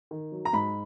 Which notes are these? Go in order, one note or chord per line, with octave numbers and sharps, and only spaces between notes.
D#3
F#3
A#5
G#2 B5